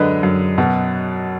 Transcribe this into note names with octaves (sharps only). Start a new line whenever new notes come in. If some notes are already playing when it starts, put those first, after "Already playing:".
Already playing: F#2 D3 G#3 B4 D#5
F#2
B2